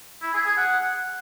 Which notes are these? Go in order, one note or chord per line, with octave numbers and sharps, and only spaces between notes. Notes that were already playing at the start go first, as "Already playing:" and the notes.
E4
G#4
G#4
F#5